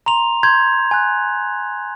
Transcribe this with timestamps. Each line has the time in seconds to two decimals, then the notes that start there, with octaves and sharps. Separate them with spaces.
0.06 A#5 C6 F7
0.43 C6 G6 G#6
0.91 G#5 F#6